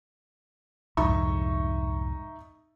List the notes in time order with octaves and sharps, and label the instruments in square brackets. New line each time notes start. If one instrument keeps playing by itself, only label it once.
[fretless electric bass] C2 F2 G#2 [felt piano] D#4 E5 C#6